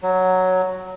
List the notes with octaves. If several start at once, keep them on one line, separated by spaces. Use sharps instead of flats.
F#3